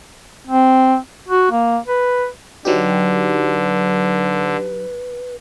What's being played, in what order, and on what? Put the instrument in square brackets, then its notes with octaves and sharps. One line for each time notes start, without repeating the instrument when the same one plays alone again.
[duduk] C4
F#4
A#3
B4
[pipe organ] D3 [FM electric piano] F#3 D#4 G4 [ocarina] B4